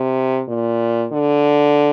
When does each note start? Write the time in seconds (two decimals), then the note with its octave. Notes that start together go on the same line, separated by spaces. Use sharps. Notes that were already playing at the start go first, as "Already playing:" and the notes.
Already playing: C3
0.48 A#2
1.12 D3